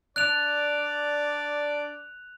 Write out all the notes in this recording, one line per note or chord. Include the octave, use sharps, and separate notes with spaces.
D4 D5 F#6 F7